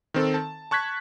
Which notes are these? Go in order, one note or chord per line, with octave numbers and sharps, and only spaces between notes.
D#3 C4 A4
A5
A5 C#6 F#6 G#6 B6